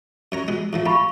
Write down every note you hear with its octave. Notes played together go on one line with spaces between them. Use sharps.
F#2 C#5 A#5
B2 G#3
E2 A2 F3
A3 A4 F5 B5 C#6